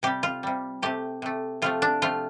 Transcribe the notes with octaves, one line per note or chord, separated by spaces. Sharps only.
C3 G3 G4
F4
C3 G3
C3 A3 G4
C3 A3
C3 F3 A3 F4
D4
C3 F3 A3 F4